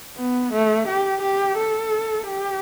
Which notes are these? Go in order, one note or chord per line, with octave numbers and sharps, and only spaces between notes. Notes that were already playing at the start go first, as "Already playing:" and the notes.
B3
A3
G4
G4
A4
G4